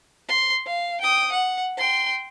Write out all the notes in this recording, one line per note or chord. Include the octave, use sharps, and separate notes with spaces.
C6
F5
G5 D#6
F#5
G5 C6